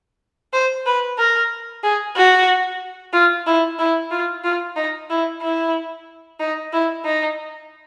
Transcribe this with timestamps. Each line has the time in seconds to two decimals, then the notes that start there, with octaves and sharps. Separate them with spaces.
0.53 C5
0.86 B4
1.19 A#4
1.84 G#4
2.17 F#4
3.13 F4
3.47 E4
3.79 E4
4.11 F4
4.44 F4
4.76 D#4
5.10 E4
5.42 E4
6.40 D#4
6.73 E4
7.05 D#4